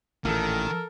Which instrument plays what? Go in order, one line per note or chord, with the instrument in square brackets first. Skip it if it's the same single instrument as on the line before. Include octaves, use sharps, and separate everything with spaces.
[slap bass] A1 A#2 [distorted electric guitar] D#3 [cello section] A4 [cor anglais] A#4